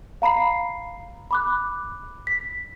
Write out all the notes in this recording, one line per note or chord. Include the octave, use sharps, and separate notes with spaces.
F5 A#5 B5 C7
B5 D6 F#6
B6